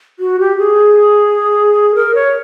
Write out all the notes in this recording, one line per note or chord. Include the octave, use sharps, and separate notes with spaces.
F#4
G4
G#4
A#4
C#5